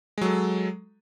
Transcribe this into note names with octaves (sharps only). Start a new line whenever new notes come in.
F#3 G#3 A4